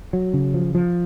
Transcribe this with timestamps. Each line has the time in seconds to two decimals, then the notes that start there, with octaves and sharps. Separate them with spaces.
0.13 F#3
0.34 C#3
0.54 F3
0.75 F3